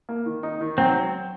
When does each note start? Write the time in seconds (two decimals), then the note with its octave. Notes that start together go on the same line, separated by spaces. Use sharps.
0.09 A#3
0.26 D#3
0.43 D#4
0.61 D#3
0.78 F#3 C4